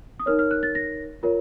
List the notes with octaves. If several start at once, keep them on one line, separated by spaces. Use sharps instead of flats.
D#6
D#4 A#4 C#5 F6
F6
F#6
A6
A#6
F4 A#4 C#5